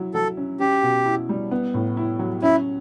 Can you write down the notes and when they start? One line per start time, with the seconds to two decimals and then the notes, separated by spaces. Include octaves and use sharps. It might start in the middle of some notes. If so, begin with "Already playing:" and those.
Already playing: F#3 E4
0.14 F#3 A4
0.37 C#4
0.60 C#4 G4
0.83 B2
1.06 E4
1.29 G3
1.51 B3
1.74 A2
1.97 E4
2.19 F#3
2.42 C#4 E4